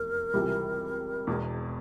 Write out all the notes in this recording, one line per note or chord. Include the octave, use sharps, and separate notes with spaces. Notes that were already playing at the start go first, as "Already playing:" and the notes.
Already playing: F1 E2 C3 A#4
C#2 C3 E3 G3
E1 E2 B2